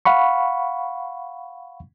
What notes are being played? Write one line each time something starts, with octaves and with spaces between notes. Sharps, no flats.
F5 F#5 B5 C#6